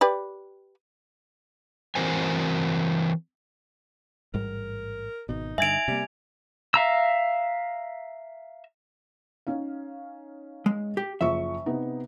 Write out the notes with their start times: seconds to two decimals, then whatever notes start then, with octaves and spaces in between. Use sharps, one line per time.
0.01 G4 B4 D5
1.95 E3 C4 F#4 A#4 C5 G#5
4.34 A1 G#2 G3 A#4
5.29 G#1 B2 D#4
5.58 G2 D3 E5 G#5 G#6 D7 F7
5.88 C3 G3 A#3
6.74 E5 F5 A#5 E6
9.47 C#4 D#4 F5
10.66 G#3
10.97 G4
11.21 F#1 F3 E5 C#6
11.66 C3 B3 D#4